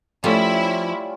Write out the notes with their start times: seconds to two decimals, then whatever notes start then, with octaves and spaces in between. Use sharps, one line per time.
0.24 F3 G3 A3 C#4 E4 F4 A4 C#5